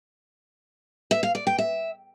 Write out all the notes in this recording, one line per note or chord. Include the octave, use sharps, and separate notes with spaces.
E5
F5
D5
G5
E5